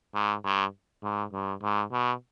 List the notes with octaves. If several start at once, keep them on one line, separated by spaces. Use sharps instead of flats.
G#2
G2
G#2
G2
G#2
B2